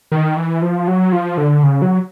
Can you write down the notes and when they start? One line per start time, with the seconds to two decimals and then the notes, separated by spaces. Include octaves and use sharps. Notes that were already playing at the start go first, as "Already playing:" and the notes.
0.12 D#3
0.37 E3
0.62 F3
0.88 F#3
1.12 F3
1.38 D3
1.63 C#3
1.82 F#3